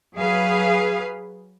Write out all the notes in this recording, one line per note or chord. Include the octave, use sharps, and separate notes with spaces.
F#3 G#4 B4 F5